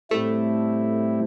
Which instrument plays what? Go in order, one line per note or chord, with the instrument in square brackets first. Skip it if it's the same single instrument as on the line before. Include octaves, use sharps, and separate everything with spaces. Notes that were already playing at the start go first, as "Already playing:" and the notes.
[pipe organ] A2 G3 C4 E4 [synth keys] A3